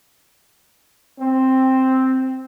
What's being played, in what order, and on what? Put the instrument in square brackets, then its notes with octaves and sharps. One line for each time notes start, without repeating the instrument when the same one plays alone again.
[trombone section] C4